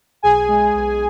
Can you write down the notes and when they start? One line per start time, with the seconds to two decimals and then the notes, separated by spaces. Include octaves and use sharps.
0.22 B1 G#4 G#5
0.48 G#3
0.75 B1